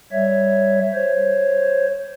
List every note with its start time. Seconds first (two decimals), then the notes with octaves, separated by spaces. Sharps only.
0.12 G3 C#5 E5
0.94 C5 C#5